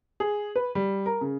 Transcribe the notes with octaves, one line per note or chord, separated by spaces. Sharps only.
G#4
B4
G3
A#4
C#3